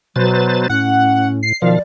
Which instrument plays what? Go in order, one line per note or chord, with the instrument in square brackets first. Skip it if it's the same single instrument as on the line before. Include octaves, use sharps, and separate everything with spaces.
[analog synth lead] B2 [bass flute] F#3 [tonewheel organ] B4 C5 A6
[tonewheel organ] A2 [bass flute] C#4 [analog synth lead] F#5
[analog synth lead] C7
[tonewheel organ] B2 D#3 F5 [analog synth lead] F3 [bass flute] D5